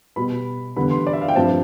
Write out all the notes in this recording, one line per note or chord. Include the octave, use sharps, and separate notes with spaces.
B2 G3 B3 B5
E2 D3 G3 B3 B5
C6
D5
E5
F5
G5
G2 F3 C4 A5